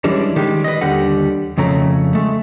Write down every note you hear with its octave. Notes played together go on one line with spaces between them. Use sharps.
E3 G3 G#3 C#4 D4
D#3 G3 G#3
B4 D#5
D#2 D3 G3 F#5
F2 C#3 A3 A#5
G#3 A3